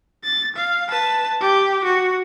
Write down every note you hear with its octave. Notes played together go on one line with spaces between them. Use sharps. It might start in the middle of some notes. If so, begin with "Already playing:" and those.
A6
F5
B4 A5
G4
F#4